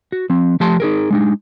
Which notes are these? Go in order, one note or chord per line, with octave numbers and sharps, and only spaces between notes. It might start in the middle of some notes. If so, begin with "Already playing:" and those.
F#4
F3 C4
F3 A3 G4 A5 C6
D#4 G#4 A#4
G#3 D4 D#4